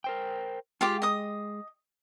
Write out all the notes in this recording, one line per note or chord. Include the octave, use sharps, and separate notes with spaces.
A#4 C5 G5
G#3 F4 G4 G#4 D6
D#5 D#6